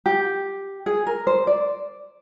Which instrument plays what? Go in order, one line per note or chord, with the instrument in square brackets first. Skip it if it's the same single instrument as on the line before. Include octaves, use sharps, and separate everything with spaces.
[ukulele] G4
G#4
A#4
C5
D5